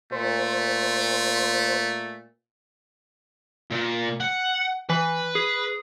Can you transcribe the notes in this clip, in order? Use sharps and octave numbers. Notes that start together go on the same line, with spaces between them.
A#2 A3 C5
A#2
F#5
E3 B4
G#4